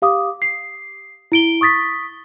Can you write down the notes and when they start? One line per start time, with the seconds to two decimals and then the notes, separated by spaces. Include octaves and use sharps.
0.02 G4 F5 D6 D#6
0.42 C7
1.32 E4 D7 G7
1.61 C#6 D#6 A6 B6